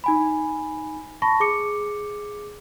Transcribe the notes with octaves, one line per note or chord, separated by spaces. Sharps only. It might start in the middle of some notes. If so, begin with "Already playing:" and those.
D#4 G#5 B5
A5 B5 C#6 A#6
G#4 D6 C#7